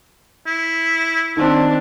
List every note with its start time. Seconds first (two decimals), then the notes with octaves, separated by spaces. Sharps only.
0.47 E4
1.37 D#3 C4 D4